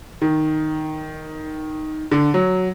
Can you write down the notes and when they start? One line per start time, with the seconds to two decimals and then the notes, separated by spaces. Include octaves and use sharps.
0.22 D#3
2.11 D3
2.34 F#3